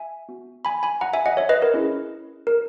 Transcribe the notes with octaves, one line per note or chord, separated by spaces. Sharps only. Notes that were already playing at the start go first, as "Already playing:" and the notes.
Already playing: E5 G#5
B3 F#4
G#5 B5
G#5 B5
F#5 A#5
E5 G#5
D#5 F#5
C#5 E5
B4 D#5
A#4 C#5
C#4 E4 G#4
A#4